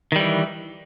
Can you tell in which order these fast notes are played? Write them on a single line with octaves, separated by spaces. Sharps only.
D#3 G3 E3